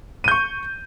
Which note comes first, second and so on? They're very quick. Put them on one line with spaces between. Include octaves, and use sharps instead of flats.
D#7 G6 C#6